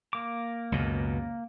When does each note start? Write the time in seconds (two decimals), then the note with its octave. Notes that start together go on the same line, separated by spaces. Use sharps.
0.13 A#3 D6
0.72 C#2 F#2 B2